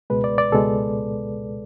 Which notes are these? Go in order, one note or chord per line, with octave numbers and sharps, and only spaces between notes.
C#2 B2 G#3 B4
D5
D5
C#2 B2 G#3 A4